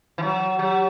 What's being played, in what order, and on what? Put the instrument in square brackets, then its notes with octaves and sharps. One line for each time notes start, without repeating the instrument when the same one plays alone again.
[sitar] E3
F#3
[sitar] F#3 [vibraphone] G4